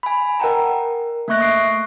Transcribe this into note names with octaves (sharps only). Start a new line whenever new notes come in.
G#5 B5
A#4 D#5 F#5 G5 A5 A#5
A#4
A3 A#3 E5 C#6 F#6 A#6
C#6 D#6 F#6 C7 D7